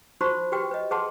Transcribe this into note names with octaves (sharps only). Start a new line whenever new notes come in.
D#4 F4 F#4 C5 B5 C#6
F#4 G4 B4 G5
B4 D#5
G#4 B4 F#5 A5 C6